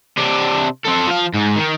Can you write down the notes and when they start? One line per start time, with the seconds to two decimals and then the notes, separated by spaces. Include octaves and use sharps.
0.18 C3 D4
0.85 C4 A4
1.07 F3 F5
1.34 G#2
1.56 D#3